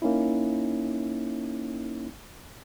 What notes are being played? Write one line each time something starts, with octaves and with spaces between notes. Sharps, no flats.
A#3 C#4 D#4 E4